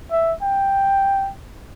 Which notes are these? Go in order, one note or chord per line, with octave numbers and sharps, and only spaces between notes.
E5
G5